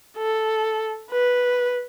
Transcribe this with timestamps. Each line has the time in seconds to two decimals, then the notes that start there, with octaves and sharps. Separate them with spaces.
0.17 A4
1.11 B4